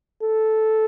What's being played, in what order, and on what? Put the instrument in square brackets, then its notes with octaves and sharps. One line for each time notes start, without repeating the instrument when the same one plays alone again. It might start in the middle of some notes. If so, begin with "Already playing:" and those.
[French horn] A4